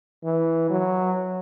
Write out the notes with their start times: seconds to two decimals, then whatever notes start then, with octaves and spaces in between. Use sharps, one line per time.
0.23 E3
0.70 F#3